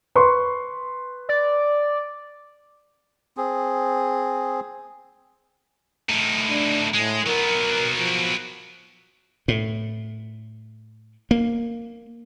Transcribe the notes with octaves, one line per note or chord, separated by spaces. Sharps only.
B4 C6 C#6
D5
C4 G#4
A2 D#4
D4
A2 G#3
F#3 B3 A#4
F3
A2
A#3